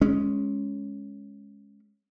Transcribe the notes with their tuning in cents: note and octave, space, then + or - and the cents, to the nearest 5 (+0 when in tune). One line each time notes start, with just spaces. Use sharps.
G#3 +0 C#4 +0